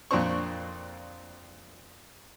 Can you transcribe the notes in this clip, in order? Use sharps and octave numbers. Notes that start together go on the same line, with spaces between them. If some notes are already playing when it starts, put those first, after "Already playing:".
F2 A#2 C4 D4 C5 C#6